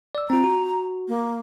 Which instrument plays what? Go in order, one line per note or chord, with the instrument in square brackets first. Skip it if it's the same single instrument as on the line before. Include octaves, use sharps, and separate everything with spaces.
[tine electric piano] D5 E6
[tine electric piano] C4 F4 [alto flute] A#5
[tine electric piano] F#4
[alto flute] A#3